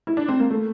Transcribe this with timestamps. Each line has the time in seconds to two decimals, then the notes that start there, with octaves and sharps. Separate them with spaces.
0.07 E4
0.17 D4
0.28 C4
0.40 A#3
0.51 A3